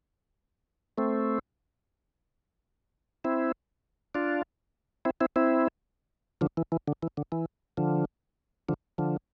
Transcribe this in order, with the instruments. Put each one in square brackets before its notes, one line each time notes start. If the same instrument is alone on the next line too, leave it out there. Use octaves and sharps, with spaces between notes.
[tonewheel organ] A3 C4
C4 E4
D4 F4
C4 E4
C4 E4
C4 E4
D3 F3
E3
E3
D3
E3
D3
E3
D3 F3
D3 F3
D3 F3